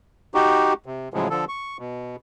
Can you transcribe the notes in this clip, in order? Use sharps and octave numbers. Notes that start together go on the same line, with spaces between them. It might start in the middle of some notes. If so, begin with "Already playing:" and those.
D#4 F#4 G4
C3
A2 C#3 F3 F#3 G#3
D3 F3 A4
C#6
B2